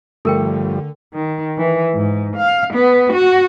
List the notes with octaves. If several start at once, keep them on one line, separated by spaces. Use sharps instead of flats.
G2 D3 F3 G3 A3 A4 A#4 G5
D#3
E3
G#2
F5
B3
F#4